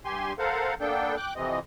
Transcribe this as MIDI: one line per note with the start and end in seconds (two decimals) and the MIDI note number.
0.05 0.33 43
0.05 0.33 67
0.05 0.33 80
0.05 0.33 84
0.39 0.74 69
0.39 0.74 70
0.39 0.74 72
0.39 0.74 77
0.39 0.74 78
0.80 1.15 58
0.80 1.15 59
0.80 1.15 62
0.80 1.15 69
0.80 1.15 79
1.17 1.33 79
1.17 1.33 86
1.17 1.33 90
1.36 1.59 41
1.36 1.59 48
1.36 1.59 52
1.36 1.59 60
1.36 1.59 75